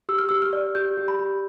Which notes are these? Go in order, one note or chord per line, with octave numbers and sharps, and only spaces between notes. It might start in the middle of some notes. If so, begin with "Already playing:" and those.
G4 E6
F6
G4 E6
F6
D5
G4 G6
G4
B5
G4